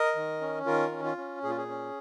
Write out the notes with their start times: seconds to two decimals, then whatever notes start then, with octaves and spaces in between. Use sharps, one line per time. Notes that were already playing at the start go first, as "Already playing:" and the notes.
Already playing: A#4 D#5
0.15 D#3
0.41 C#4
0.66 D#3 F4 A#4
0.92 C#4
1.04 F4
1.18 C#4
1.43 A#2 G#4
1.50 F4
1.58 G#4
1.69 C#4